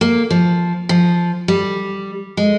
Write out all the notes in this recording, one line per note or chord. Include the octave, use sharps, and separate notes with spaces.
A#3
F3
F3
G3
G#3